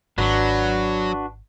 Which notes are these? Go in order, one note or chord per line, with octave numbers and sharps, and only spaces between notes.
G#1 F#3 D4 F#4 B4